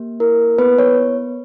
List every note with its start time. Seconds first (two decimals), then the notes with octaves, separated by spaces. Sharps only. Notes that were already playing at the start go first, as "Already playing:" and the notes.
Already playing: A#3 G4
0.20 E4 A#4
0.58 B3 B4
0.78 C#5